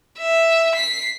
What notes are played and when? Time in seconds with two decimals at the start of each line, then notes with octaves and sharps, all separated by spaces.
0.19 E5
0.75 B6 C7